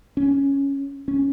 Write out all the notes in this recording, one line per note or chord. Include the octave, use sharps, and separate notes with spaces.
C#4
C#4